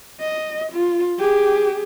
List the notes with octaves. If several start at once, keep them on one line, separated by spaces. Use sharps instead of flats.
D#5
F4
G4 G#4